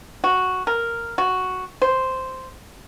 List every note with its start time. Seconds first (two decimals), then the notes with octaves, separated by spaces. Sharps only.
0.24 F#4
0.67 A#4
1.18 F#4
1.82 C5